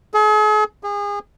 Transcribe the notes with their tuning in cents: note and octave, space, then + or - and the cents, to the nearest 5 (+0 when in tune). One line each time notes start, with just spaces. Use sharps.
G#4 +45
G#4 -30